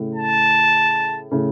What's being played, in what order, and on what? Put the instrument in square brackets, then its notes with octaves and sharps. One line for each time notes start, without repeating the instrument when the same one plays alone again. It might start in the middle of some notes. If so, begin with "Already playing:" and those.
Already playing: [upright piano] A2 C#3
[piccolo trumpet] A5
[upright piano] A2 C#3